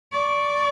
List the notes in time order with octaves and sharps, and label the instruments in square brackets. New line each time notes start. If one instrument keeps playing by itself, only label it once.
[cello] D5 [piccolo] C#6